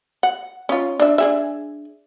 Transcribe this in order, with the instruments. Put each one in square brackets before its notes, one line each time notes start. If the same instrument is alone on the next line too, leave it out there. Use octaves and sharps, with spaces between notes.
[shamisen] F#5
C#4 D#4 F4
D4 E5
D4 G#4 E5